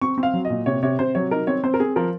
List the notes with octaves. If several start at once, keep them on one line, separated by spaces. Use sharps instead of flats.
C4 C#6
C4
F5
F#3
D#5
A#2
C3 C#5
C3 C#5
C3 C5
F#3 C#5
D#4 A#4
C4 C#5
C4 C5
A#4
C4 G#4
F3 A#4